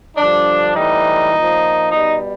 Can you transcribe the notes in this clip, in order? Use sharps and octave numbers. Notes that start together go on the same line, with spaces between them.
G2 D3 F3 D4
A2 E3 G3 D#4
A#2
F3
B2 G3 D#4